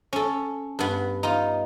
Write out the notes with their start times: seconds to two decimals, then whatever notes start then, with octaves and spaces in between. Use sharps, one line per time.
0.13 C#4 A4
0.79 G2 B3
1.23 D#4 F4